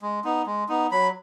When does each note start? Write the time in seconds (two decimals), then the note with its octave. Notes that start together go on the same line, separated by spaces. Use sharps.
0.02 G#3
0.25 B3 D#4
0.46 G#3
0.69 B3 D#4
0.92 F#3 B5